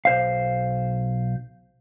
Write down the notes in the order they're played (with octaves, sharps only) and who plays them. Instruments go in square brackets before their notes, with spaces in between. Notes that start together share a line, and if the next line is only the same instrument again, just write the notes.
[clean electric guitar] B1 C5 F5